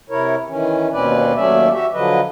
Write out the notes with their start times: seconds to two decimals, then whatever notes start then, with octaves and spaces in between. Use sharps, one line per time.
0.09 C3 E4 A#4 C#5
0.48 D#3 E3 C#4
0.91 D#2 B2 C4 C#4 B4 D5
1.35 D#2 F#3 A3 C#4 D5 E5
1.72 F#4 G4 E5
1.93 D3 F3 F#3 B4 D#5